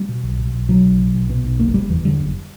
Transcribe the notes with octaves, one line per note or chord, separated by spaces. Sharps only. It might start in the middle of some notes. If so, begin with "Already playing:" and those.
Already playing: G3
B2
B1
B2
B1
B2 F#3
B1
B2
B1
B2
B1
F#1 A#3
F#1 G3
E2 E3
D3 G3
F#1